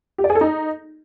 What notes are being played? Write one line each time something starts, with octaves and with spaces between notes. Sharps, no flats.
G4
D5
G#4
A4
D#4